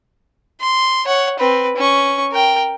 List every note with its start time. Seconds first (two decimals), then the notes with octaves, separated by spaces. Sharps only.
0.61 C6
1.06 C#5 F#5
1.39 C4 B4
1.77 C#4 C#6
2.32 A#4 G5